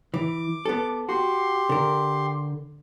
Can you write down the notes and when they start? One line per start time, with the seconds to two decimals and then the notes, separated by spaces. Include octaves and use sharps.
0.14 E3 D6
0.65 B3 A4
1.09 F#4 G4 C6
1.69 D3 A#4